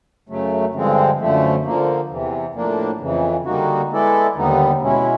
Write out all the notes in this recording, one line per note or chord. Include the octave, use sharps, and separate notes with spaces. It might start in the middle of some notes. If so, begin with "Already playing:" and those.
F#2 C#3 F#3 A3
G2 D3 F3 G#3 C4
F#2 D3 F3 A3
D3 F3 A#3
E2 C3 E3
A2 F3 A#3 D4
F2 C#3 E3
D3 G3 A#3 D#4 F#4
G#3 B3 E4 A4 D5
D#2 D3 G3 B3 D#4
B2 G#3 C#4 E4